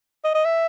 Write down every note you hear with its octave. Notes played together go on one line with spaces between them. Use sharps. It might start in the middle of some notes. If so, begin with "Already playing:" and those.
D#5
D#5
E5